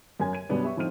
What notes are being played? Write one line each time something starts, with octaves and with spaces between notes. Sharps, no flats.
F#2 A#4 G#5 G#6
G#6 D#7
F#2 B2 G3 B3 D4
G4 E5 C#6
A2 F3 C4 D#4 F6 D#7